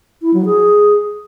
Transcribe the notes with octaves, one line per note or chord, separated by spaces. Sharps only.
E4
F#3
G#4